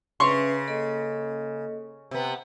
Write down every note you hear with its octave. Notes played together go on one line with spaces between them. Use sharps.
C#3 C#4 B4 E5 C6 C#6
A#3 A4 D#5
C3 B3